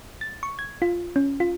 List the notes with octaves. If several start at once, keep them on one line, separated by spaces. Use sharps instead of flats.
A6
C#6
G#6
F4
C#4
F4